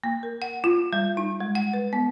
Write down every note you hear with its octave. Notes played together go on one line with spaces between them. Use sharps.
A#3
A#4
F#5
F4
G3
D#4
G#3
F#5
B4
B3